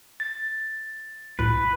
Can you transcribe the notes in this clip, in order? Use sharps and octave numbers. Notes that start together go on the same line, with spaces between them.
A6
C2 A2 B4